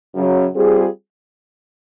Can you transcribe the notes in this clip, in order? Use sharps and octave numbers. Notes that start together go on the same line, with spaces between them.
F#2 C#3 F#3
G3 C4 F4 G#4